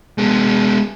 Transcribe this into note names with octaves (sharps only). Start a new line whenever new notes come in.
G#3 B3